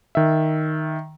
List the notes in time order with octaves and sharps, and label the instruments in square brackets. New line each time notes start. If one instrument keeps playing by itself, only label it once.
[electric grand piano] D#3 E5